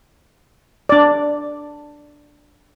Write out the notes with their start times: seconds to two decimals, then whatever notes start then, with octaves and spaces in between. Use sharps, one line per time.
0.89 D4 D5